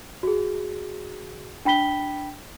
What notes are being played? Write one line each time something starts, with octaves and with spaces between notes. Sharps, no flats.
F#4 G#4
D4 G5 B5 B6 G7